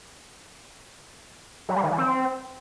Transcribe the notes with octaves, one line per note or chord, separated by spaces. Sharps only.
F#3
G3
D#3
E3
C4